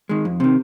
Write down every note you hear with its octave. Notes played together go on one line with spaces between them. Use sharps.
D#3 G#3
F2
C3 D#3